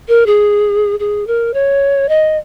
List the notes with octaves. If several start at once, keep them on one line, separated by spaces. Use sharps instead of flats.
A#4
G#4
G#4
A#4
C#5
D#5